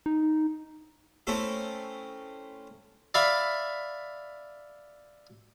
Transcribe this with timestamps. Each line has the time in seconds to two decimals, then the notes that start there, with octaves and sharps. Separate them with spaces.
0.06 D#4
1.27 A3 C4 C#4 E4 A4
3.14 D5 E5 F5 B5